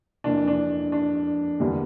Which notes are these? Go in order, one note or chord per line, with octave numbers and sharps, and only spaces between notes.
F2 E3 A#3 D4
D4
D4
E2 D3 G3 A#3